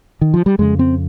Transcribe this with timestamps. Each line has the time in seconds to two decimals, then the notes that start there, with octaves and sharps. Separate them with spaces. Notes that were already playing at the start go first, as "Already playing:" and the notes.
0.21 D#3
0.34 F3
0.46 G3
0.58 F2 C#3 G#3
0.79 C4